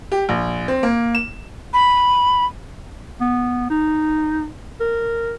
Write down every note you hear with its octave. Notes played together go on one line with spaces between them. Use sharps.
G4
A#1
C4
A#3
E7
B5
B3
D#4
A#4